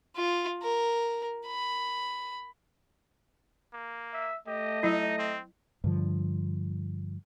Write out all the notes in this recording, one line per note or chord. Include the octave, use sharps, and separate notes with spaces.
F4
A#4
B5
A#3
E5
A3 G4 D#5
F#3 D#4 E4
C4
G2 D3 F3